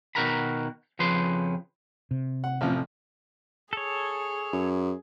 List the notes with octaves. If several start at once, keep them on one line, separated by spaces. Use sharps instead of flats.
B2 D#3 F#4 A#4 A#5 B5
F2 C#3 F3 B4 C6
C3
F#5
A1 F2 F3
G#4 A4 C#5
F#2